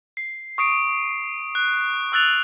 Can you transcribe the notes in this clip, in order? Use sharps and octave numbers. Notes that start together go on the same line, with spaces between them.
C7
C#6 D#6 C7 D7
F#6
C#6 E6 F#6 A6 F7